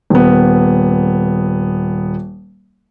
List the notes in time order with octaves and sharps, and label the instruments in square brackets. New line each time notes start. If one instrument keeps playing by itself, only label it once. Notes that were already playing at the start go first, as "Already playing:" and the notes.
[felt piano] D#1 B3